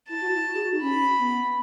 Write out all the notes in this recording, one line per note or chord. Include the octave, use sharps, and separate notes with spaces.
E4 A5
F#4
E4
F#4
G#4
F#4
D#4
C#4 B5
B3